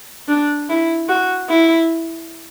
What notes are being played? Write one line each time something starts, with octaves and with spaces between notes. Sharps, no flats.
D4
E4
F#4
E4